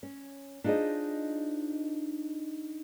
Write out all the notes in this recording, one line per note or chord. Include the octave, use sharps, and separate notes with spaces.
C#4
D4 D#4 F4 G#4 C5 D#5